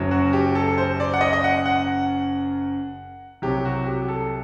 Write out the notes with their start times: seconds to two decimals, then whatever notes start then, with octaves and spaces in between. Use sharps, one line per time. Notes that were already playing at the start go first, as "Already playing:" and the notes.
Already playing: F#1 F#2 F#3
0.11 F#4
0.33 G4
0.55 A4
0.78 C5
1.00 D5
1.14 F#5
1.21 D#5
1.33 D#5
1.44 F#5
1.66 F#5
3.42 C2 C3 F#3 G4
3.65 F#4
3.86 G4
4.09 A4